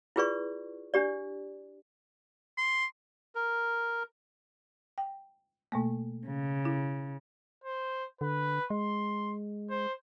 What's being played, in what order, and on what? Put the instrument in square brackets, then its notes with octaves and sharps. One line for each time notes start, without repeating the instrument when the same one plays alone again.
[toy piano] E4 F4 G#4 B4 D5 C#6
D4 G4 D5
[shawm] C6
[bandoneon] A#4
[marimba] G5
B2 A3 A#3
[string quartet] C#3
[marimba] E4
[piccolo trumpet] C5
[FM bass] D3 [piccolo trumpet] B4
[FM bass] G#3 [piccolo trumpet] C6
[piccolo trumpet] C5